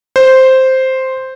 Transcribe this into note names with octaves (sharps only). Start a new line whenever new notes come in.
C5